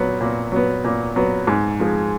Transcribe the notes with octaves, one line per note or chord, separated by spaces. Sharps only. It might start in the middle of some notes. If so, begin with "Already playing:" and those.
Already playing: A#2 F#3 B3
A#2
F#3 B3
A#2
F#3 B3
G#2
F3 G#3